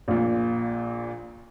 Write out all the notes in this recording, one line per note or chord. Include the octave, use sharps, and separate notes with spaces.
A#1 A#2